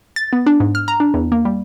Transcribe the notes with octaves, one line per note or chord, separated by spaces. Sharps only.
A6
B3
D4
G#2
F6
A#5
D4
E2
A#3
G3